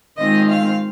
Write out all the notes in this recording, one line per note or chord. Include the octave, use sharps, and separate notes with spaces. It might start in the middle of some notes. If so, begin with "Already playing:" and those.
D#3 G#3 C4 F4 D#5
F5